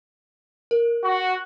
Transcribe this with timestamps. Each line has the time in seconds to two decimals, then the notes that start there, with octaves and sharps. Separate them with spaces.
0.71 A#4
1.04 F#4